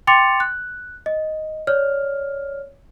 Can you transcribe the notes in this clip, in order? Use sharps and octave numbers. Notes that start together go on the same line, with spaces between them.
G5 C6 D6 A6 C#7 F7
F#6
D#5
C#5 D5 F6